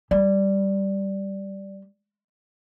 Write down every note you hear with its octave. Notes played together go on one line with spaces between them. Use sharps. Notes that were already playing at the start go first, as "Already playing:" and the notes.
G3 D5